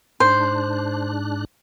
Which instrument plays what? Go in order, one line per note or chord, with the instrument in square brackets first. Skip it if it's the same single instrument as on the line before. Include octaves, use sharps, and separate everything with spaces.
[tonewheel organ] G#2 D4 F#6 [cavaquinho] C5